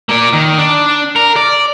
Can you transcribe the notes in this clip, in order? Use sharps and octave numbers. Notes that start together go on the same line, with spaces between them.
A#3 D5
D#3
D4
A#4
D5